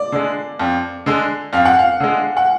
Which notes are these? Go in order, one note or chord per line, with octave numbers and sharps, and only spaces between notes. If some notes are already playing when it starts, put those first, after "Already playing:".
Already playing: D5
D3 G#3
F2
D3 G#3
F2 F5
F#5
F5
D3 G#3
F#5